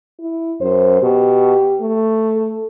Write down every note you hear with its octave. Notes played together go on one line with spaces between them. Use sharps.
E4
F#2 C5
B2 G4
A3
A4